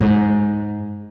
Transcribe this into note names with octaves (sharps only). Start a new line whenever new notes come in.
G#2